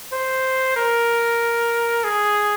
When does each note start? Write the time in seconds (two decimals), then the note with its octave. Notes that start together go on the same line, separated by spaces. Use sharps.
0.12 C5
0.76 A#4
2.04 G#4